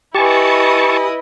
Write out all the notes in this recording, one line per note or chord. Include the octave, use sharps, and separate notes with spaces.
E4 G4 B4 D#5 G#5 A5 C#6